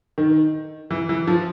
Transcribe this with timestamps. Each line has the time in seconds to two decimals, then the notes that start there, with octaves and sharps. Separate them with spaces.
0.18 D#3
0.91 E3
1.09 E3
1.27 F3